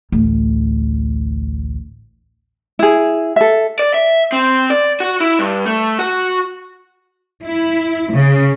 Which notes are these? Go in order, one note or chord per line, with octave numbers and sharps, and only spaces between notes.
A1 D2
E4 G#4
A4 E5
D5
E5
C4
D5
F#4
E4
G2
A3
F#4
E4
C#3